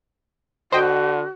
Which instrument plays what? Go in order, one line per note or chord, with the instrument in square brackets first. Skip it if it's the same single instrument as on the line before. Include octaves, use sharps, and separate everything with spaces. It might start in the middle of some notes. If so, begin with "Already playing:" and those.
[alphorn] D3 [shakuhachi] F#4 [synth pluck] C5 D#5 G5